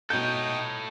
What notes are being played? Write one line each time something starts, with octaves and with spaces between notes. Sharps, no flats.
B2 D#4 A4 C#5 G5 D#6 G6